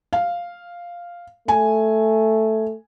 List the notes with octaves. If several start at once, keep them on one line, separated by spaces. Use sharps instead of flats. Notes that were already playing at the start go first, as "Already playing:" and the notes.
F5
A3 G#5